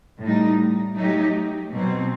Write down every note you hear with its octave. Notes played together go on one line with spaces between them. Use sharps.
A2 G3 D#4
F#3 A3 D#4 G4
B2 F#3 C4